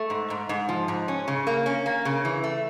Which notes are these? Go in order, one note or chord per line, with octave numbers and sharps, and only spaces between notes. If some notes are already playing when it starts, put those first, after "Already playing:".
Already playing: A3
G#2
G#2
G#2
F3
G#2
C#4
C#3
A#3
C#4
A#3
C#3
E3
A3